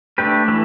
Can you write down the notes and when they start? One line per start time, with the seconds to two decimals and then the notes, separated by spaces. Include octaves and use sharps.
0.18 A3 D4 G4 B4
0.48 E3 A3